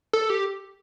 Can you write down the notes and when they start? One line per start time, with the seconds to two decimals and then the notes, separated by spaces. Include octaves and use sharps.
0.13 A4
0.30 G4